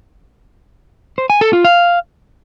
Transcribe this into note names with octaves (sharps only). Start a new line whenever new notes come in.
C5
G#5
A4
F4
F5